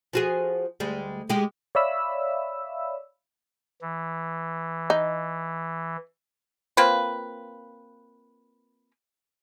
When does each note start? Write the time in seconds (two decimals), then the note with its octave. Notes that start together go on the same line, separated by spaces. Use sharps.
0.13 F3 F#4 G#4
0.80 D2 G3 G#3
1.30 G#3 G4
1.75 C#5 D5 E5 F5 B5 E6
3.82 E3
4.90 D#4
6.77 A#3 C4 F4 B4